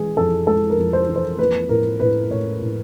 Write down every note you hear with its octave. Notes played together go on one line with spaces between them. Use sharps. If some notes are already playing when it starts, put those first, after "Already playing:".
Already playing: E3 G#3 G#4
F2 A4
G#3 A4
A#4
F2
C5
E3
C5
A#3 B4
A2 A#4
A2 B4
A2 C#5
A2